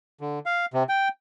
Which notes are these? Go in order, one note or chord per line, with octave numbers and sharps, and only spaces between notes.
D3
F5
C3
G5